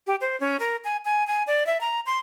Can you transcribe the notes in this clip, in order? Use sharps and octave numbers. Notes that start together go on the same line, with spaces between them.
G4
C5
C#4
A#4
G#5
G#5
G#5
D5
E5
A#5
C6